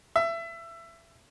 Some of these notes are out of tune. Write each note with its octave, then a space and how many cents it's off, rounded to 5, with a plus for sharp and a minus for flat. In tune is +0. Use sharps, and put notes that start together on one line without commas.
E5 +25